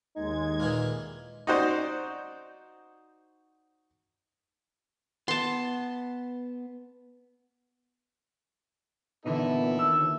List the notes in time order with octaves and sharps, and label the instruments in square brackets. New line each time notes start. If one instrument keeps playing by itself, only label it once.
[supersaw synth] D#2 G#3 G#6 [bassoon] D#4
[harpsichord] A#2 D#3 E3
[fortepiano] D#4 F#4 C5 D5
[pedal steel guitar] B3 [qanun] A5 C6
[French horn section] A#2 B3 [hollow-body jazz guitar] D3 E3 D#4 [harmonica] E4 A4 E5
[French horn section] D#2 [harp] E6